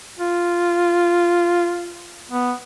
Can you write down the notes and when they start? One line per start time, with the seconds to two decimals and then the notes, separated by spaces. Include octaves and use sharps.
0.19 F4
2.31 B3